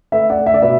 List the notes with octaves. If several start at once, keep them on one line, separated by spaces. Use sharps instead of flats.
A3 B4 E5
D5 F#5
A3
E5
D5
B2 B4 E5